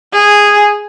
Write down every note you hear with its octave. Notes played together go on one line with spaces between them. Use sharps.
G#4